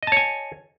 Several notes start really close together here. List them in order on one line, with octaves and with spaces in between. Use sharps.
D#5 A5 C#5 G#5